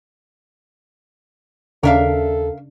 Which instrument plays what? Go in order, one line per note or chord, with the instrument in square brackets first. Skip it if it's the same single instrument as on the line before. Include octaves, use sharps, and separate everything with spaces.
[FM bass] D#2 [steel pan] C#3 D4 [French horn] A4 [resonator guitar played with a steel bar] A#4 E5 F5